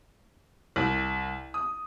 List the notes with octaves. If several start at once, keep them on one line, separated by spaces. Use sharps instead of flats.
C2
D#6